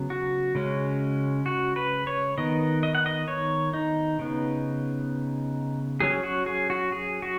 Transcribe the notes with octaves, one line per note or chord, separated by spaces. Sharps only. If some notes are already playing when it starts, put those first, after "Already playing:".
Already playing: C#3 F#3 B3
F#4
C#3 G#3 C#4
F#4
B4
C#5
D#3 B3 D#5
D#5
F#5
D#5
C#5
D#4
C#3 B3
F#3 C#4 G#4
F#4
G#4
F#4
G#4
F#4